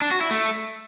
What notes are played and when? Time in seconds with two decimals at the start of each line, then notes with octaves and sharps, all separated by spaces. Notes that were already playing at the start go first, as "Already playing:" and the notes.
0.02 D4
0.11 F#4
0.21 E4
0.31 A3